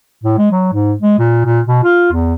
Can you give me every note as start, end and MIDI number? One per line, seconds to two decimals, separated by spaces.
0.24 0.37 45
0.38 0.51 56
0.52 0.70 54
0.73 0.94 44
1.02 1.15 56
1.19 1.42 46
1.45 1.61 46
1.67 1.80 47
1.84 2.09 65
2.12 2.34 40